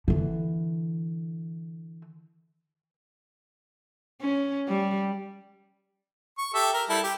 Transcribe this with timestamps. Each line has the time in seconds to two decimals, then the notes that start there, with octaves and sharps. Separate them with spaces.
0.08 D3 E3
4.21 C#4
4.67 G3
6.38 C#6
6.54 G4 A4 E5
6.74 A#4
6.89 G3 E4 A4
7.03 G4